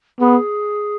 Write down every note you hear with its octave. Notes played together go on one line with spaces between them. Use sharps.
B3 G#4